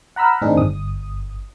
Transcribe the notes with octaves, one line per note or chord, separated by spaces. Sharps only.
F#5 A#5 B5 E6 F6
A2 D#3 C4 D4 D#4 G#4
G1 D#6